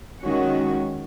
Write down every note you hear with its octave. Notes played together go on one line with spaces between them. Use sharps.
D#3 G#3 C#4 F#4